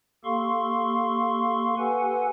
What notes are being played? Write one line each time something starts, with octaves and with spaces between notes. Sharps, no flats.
A#3 G4 A4 F5 C6 C#6
G4 A4 B4 F#5 G#5